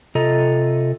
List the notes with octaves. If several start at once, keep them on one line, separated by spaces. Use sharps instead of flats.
C3 F4 A4 D#5 A#5